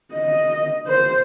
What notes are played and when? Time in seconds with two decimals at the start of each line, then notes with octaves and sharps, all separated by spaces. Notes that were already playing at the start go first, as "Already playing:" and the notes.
0.13 D#5
0.87 C5